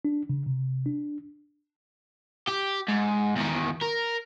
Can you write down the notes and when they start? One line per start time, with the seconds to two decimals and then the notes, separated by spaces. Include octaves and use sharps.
0.05 D4
0.29 C#3
0.46 C3
0.86 D4
2.48 G4
2.89 G#2
3.37 E2 D#3
3.81 A#4